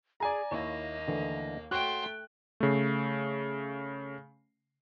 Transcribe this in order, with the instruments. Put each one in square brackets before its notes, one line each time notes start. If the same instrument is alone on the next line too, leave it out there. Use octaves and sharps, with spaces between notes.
[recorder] G#4 [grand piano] D5 G#5 A#5
[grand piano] D#2 [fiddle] A#3 [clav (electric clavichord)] E4 C#5 [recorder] D#5
[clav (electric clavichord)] D3 E3 A3
[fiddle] A3 G5 [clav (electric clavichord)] F#4 C#5 [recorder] C6 [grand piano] F#6
[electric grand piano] C#3 A3